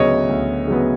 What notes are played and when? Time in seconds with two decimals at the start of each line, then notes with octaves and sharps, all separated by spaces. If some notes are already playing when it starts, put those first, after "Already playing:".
Already playing: D2 C#3 F#3 B3 C#5 D#5
0.29 D2
0.67 C#3 F#3 B3